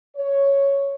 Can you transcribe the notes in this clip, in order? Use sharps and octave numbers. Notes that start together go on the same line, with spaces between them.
C#5